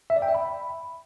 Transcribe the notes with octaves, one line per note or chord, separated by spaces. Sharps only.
E5
D5
G5
E5
B5